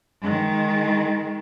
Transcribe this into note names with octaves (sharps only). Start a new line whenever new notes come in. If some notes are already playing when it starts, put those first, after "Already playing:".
D#3 G#3